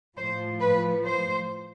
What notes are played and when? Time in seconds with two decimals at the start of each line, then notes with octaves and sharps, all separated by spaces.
0.17 A2 F3 C5
0.60 B4
1.04 C5